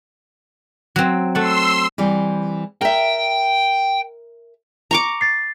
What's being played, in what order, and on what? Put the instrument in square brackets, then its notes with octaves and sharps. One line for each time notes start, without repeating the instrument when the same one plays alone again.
[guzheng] F#3 C4
[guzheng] A3 F#5 [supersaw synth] C6 E6
[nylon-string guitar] E3 G3 C4
[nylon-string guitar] A#4 E5 [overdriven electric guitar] G5
[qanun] A#5 C#6 D6
[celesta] A6 C7